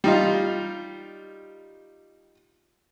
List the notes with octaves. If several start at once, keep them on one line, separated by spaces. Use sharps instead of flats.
G3 D#4 F4